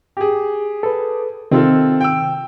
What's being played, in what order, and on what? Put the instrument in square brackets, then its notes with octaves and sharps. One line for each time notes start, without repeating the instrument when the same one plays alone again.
[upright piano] G4 G#4
[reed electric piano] A4 B4
[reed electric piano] C3 D#3 [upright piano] C4 F4 A4
[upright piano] G5 E6